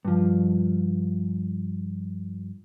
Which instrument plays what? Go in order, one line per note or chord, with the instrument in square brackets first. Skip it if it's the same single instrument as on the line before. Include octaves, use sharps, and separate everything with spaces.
[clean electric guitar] G2 F3